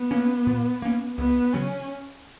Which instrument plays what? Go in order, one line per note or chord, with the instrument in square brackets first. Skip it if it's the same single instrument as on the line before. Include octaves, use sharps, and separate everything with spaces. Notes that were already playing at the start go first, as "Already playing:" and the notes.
Already playing: [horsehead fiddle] B3
[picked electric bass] A#3 C#4
A#2
A#3 C#4
[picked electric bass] C#2 [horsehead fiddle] B3
[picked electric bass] C#3 F#3 [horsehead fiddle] C#4